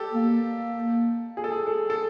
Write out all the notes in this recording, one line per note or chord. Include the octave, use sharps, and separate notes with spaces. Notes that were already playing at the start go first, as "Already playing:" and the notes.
Already playing: G4 A4
A#3
G#4
A4
G#4
A4
A4